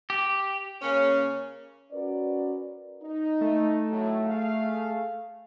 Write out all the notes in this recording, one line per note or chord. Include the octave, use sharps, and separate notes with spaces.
G4
C#3 A#3 C#4
C#4 F#4 A#4 B4 D5
D#4
A3
A2 F#3
G#4 F5